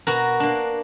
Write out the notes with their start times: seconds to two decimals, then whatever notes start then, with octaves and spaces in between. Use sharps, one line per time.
0.07 B2 F#4 A#4
0.40 A#3 D4